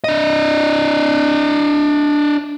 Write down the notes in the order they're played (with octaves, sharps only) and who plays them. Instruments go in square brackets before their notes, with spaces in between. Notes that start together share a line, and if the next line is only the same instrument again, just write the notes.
[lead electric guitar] D4 D#5